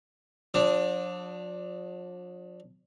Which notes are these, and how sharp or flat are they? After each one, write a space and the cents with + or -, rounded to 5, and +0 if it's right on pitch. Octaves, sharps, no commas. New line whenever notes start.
F3 +45 D4 +0